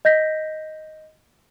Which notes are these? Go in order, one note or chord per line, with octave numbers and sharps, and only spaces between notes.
D#5 G6 A#6 B6